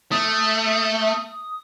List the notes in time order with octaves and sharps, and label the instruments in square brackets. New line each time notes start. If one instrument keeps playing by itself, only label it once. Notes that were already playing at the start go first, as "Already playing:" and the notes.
[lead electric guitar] A3 [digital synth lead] D#6